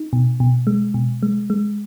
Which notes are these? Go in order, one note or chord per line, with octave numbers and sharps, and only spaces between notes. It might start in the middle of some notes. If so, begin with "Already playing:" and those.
Already playing: D#4
B2
B2
G#3
B2
G#3
G#3